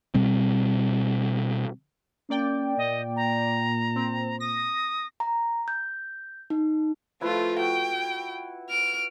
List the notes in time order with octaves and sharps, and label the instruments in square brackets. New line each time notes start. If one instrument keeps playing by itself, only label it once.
[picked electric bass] B2 G3 C4
[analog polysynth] A#3 D5 G5 [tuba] C#4
[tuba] A#2 [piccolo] D#5
[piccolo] A#5
[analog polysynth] C4
[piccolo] D#6 [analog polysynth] A#6
[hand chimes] A#5
G6
D#4
[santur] F3 E4 B4 [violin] A3 F4
[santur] F#4 [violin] G5
[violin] F6 D7